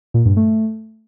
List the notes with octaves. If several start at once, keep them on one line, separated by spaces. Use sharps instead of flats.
A#2
G2
A3